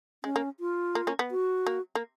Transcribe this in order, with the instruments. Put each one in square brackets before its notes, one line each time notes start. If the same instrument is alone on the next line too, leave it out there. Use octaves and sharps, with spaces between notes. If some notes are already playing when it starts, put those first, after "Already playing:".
[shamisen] G#3 [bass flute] C#4
[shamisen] A#3
[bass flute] F4
[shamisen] A#3
A#3 C#4
B3
[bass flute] F#4
[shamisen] A#3
A#3